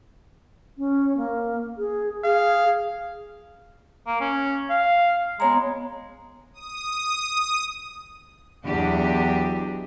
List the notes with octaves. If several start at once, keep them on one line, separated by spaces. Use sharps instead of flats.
C#4
A#3
G#4
G#4 F5
A#3
C#4
F5
G#3 B3 C#5 A#5
D#6
E2 F#3 D4 G4 D#5